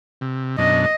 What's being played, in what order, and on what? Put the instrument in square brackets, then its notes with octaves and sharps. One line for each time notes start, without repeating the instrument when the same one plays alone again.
[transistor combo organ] C3
[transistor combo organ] F#2 B2 D4 [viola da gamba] D#5